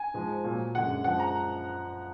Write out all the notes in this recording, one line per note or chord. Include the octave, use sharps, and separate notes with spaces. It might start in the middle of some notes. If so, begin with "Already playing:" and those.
Already playing: G#5
G#2 F3 G#3
A#2 F#3
F#2 D3 G#3 F#5
F#2 F3 G#3 F#5
A#5